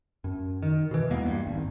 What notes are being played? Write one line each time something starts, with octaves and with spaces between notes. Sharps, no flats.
F#2
D#3
B2 E3
E2 G#3 A#3 B3
G2
G#1 C#2